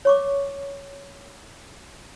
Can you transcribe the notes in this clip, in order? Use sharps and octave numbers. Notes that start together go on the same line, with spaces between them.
C#5 C#6 D6